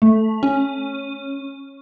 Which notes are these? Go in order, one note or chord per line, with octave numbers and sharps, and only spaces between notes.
A3
C#4